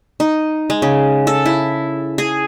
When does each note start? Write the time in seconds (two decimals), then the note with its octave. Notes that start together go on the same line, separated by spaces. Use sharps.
0.20 D#4
0.70 G#3
0.82 C#3
1.27 A4
1.46 E4
2.18 G#4